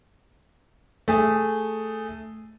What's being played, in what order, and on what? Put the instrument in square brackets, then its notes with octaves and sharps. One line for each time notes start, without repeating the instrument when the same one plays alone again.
[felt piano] A3 G#4